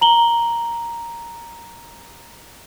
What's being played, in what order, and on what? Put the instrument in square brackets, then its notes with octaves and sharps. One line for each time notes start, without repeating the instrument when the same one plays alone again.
[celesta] A#5 F#7 G7